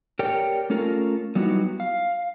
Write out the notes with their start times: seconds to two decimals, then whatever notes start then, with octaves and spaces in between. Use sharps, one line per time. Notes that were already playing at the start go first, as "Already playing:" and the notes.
0.19 G4 A#4 C#5 D5 G5
0.70 A3 C#4 F4 A4 A#4
1.35 F#3 G3 B3 D#4 E4 F#4
1.80 F5